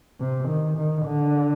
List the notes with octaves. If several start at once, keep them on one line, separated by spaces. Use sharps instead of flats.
C3
D#3
D#3
D3